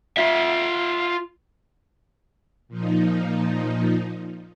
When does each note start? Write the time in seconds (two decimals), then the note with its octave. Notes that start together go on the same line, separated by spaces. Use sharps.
0.17 F4 E5
2.68 A#2 F3 D#4